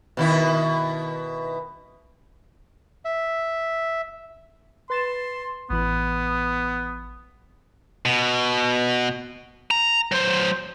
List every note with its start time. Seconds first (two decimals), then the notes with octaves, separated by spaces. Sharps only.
0.17 B2 D#3 E4
3.05 E5
4.90 B4 C6 A6 E7
5.70 A1 E3 B3 B5
8.05 B2
9.71 A#5
10.12 F#3 C5